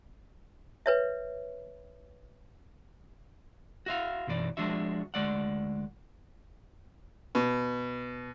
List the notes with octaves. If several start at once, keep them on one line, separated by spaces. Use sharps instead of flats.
B4 C#5 E5
F#4 E5 F5
B1 F#2 E3 D5
F3 G#3 D4 F#4 E5
D2 A#2 G#3 D5 F#5
B2